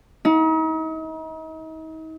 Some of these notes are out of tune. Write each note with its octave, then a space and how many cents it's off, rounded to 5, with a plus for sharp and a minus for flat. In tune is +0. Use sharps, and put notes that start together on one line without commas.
D#4 +40